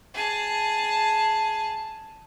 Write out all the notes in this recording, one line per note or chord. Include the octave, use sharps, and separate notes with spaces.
G#4 A5